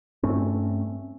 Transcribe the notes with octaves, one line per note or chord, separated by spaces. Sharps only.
G2 A3 C4 C#4